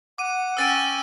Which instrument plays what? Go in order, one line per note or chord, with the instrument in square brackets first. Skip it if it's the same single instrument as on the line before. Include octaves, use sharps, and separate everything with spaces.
[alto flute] F#5 [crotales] D6 D#7
[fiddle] C#4 G5 [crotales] E6 A6 D#7